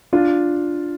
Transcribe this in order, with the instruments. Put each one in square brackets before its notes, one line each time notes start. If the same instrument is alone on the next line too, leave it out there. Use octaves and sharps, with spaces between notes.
[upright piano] D4 F4